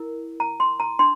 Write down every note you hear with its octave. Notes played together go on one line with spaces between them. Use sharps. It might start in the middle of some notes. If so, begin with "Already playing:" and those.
Already playing: E4 A#4
A#5
C6
A#5
D4 C6